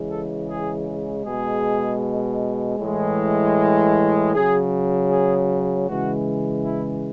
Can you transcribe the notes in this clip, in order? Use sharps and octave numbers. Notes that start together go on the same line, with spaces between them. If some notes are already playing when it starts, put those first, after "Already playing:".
Already playing: C#3 E3 G#3
A4
G#4
B2 G#3 G#4
A2 E3 G#3
C#3 F#3 G#4
G#4
C#3 E3 G#3 F#4
E4